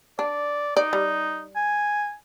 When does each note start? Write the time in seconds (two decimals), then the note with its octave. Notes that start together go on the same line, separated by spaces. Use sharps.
0.19 D4 D5
0.77 D#4 D5
0.93 G3
1.56 G#5